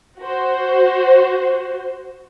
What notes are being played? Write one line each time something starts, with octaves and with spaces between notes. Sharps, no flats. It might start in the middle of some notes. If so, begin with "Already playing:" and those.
F#4 C5